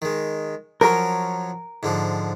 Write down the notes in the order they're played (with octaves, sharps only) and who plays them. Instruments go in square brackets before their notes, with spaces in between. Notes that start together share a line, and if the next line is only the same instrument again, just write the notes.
[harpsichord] D#3 G#3
[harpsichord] F3 F#3 C#4 [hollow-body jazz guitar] A#4
[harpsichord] G#2 D3 F3